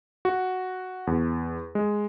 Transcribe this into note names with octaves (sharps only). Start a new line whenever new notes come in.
F#4
E2
G#3